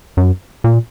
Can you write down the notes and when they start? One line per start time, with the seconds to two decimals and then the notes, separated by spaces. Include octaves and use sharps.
0.17 F#2
0.64 A#2